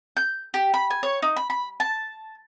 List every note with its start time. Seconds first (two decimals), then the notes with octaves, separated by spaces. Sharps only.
0.17 G6
0.54 G4
0.74 B5
0.90 G#5
1.03 C#5
1.22 D#4
1.36 B5
1.50 B5
1.80 A5